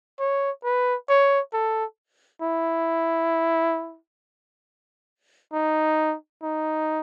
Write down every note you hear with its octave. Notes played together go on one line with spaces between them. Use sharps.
C#5
B4
C#5
A4
E4
D#4
D#4